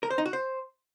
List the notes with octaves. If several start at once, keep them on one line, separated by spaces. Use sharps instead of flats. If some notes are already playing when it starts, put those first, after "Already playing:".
A#4
C5
D#4
F#4
C5